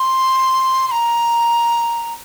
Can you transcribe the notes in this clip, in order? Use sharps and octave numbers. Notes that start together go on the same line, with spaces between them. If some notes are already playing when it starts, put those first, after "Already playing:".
Already playing: C6
C6
A#5